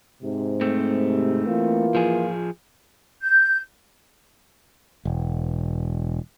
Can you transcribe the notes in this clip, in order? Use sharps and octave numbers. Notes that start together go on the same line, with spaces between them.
G#2 C3
A3 C4
E3 A#3 F4
F3 G#4
G6
E1